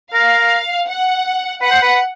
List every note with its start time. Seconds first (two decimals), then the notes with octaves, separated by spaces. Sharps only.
0.13 A#4 F5
0.87 F#5
1.61 B4 F#5
1.71 C5
1.82 B4